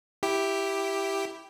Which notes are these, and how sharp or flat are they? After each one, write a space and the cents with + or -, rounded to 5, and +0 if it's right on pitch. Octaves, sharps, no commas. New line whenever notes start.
E4 +0 G4 +0